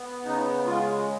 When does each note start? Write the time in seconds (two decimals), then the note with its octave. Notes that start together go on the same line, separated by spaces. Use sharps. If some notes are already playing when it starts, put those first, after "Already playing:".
Already playing: B3
0.25 C#3 D#4
0.66 G#3 F4